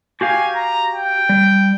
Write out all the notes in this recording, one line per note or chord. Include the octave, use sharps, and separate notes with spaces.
F#4 G4 F5 G#5
A#5
G5
G3